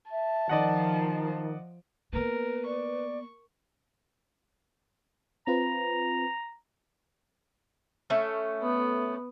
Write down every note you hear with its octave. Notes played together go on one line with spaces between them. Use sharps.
E5 A5
D#3 F3 D5 D#5 F#5
A#3 B3 A#4 B4
D5 C#6
C4 F4 B4 A#5
A3 C#4
B3